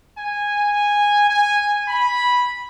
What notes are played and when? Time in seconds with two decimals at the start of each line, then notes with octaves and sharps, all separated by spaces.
0.17 G#5
1.29 G#5
1.88 B5